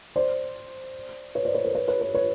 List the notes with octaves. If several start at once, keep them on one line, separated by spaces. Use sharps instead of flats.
C5 D5
B4 C#5
C5 D5
B4 C#5
A#4 C5
B4 C#5
B4 C#5
B4 C#5
B4 C#5